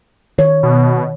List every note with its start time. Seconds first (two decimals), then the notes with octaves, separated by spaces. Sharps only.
0.38 D#3 C#5
0.63 B2